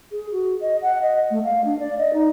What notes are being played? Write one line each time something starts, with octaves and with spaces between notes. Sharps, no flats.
G#4
F#4
D#5
F#5
D#5
A3
F5
D4
D5
D#5
D#4